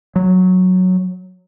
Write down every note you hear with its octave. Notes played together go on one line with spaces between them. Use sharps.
F#3